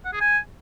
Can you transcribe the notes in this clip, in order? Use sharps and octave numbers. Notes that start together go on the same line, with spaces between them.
F#5
G#4
G#5